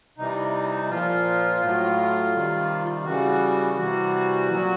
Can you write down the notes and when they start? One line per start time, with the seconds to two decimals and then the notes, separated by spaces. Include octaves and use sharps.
0.18 C3 E3 G3 D#4
0.90 A#2 F3 F4
1.62 A2 F#3
2.34 C3 D#3 G3
3.05 C#3 E3 G3 F#4
3.77 C3 E3 G3 F#4
4.49 A#2 F#3